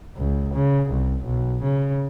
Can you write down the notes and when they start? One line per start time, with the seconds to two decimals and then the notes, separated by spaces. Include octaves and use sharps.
0.17 C#2
0.54 C#3
0.90 C2
1.25 B1
1.63 C#3